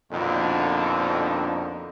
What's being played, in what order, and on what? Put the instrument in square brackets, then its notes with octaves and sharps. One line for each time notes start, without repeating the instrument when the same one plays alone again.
[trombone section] A#1 F2 B2 D3 D#4